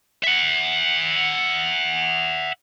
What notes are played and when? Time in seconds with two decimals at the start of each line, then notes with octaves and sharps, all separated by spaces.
0.23 E5 F#5